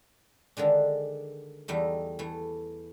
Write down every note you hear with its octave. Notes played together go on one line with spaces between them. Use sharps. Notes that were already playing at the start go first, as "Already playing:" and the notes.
D3 D#3 G#3 D4
E2 G3 A3 D#4
E3 A3